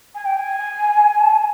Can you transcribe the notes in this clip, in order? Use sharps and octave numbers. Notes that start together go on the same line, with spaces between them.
G#5
G5
G#5
A5
G#5